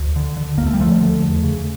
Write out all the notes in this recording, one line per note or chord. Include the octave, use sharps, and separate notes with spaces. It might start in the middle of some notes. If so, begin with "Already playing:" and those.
Already playing: D2
D3
D3
D2 A#3
A3
G3
D2 F3 A3
D3
E2
C#3